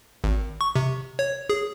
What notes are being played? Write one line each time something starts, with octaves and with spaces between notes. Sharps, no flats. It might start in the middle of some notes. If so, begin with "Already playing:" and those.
G#1
C#6
C3
C#5
G#4